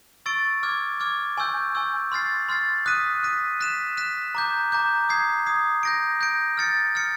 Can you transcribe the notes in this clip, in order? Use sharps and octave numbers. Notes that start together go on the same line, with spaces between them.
C#6 E6 A6 D7
D6 F6 G#6
D6 F6 G#6
G#5 C#6 E6 G6
G#5 C#6 E6 G6
C6 F6 A6 C7
C6 F6 A6 C7
D#6 F#6 B6 D#7
D#6 F#6 B6 D#7
F#6 B6 E7
F#6 B6 E7
A#5 D6 G6
A#5 D6 G6
D#6 G#6 C7
D#6 G#6 C7
G6 A#6 D7
G6 A#6 D7
F6 A6 C#7
F6 A6 C#7